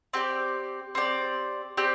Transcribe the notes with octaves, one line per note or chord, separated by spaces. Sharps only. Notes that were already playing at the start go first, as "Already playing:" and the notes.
C4 G4 D5
C4 G4 D5
C4 G4 D5